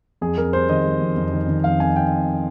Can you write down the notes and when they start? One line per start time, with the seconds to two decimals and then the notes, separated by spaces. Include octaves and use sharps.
0.21 F2 G#4
0.37 F2 A#4
0.53 G3 C5
0.69 D#3 D#5
0.85 G3
1.01 F2
1.17 F2
1.33 D#3
1.48 D#3
1.64 F2 F5
1.80 F2 G#5
1.96 G5